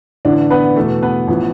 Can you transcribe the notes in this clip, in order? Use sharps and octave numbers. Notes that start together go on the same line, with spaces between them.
A1 A2 D3 E3 D4
B3 B4
E2 B2 A3 A4
B3 B4
A1 F3